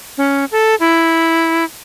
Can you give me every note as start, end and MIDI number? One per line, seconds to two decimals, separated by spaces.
0.18 0.45 61
0.52 0.75 69
0.80 1.64 64